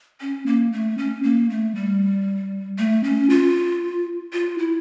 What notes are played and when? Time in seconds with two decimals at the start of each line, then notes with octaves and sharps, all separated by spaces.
0.21 C#4
0.46 A#3
0.73 A3
0.98 C#4
1.23 A#3
1.50 A3
1.75 G3
2.79 A3
3.04 C#4
3.30 F4
4.33 F4
4.58 E4